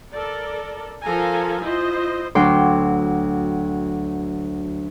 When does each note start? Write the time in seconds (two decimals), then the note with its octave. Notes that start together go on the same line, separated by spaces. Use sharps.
0.13 A4 A#4 D5
1.04 F3 A4 A#4 F5 G#5 A#5
1.62 E4 F4 C5 D#5
2.35 D2 F#3 G5 C6 D6